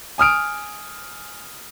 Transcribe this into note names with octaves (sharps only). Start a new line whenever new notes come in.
G#5 D#6 F6 D7